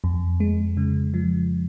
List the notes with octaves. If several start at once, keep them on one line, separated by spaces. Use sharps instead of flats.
F2
G#3
C#3
F3